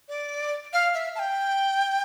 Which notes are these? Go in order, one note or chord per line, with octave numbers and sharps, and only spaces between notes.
D5
F5
E5
A5
G5